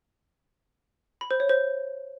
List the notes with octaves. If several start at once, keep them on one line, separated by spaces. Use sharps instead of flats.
B5
C5
C#5
C5